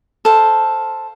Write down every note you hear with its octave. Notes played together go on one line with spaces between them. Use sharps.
A4 C5 F5